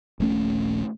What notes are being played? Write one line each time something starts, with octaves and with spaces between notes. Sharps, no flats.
D#1 A#1 A3 C#4